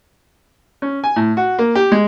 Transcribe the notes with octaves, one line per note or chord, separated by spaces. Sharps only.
C#4
G#5
A2
F#4
A#3
G4
G#3